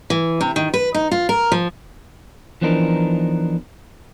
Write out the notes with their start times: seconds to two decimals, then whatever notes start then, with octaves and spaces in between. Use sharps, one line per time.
0.10 E3
0.41 C3
0.56 D#3
0.74 B4
0.95 D#4
1.11 F4
1.29 A#4
1.52 F3
2.61 E3 F3 B3 D4 D#4 A#4